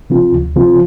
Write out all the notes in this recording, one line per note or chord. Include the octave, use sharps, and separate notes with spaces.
C3 F3 C4 F4
D2
C3 F3 C4 F4